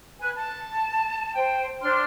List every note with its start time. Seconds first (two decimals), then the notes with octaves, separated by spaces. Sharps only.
0.19 B4 G#5 F#6
0.35 A5
1.35 C5 G5
1.82 D4 C5 C6 F6